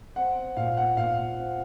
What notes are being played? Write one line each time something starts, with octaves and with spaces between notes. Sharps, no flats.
C4 F#5
A#2 F5
F#5
A#2 F5
C4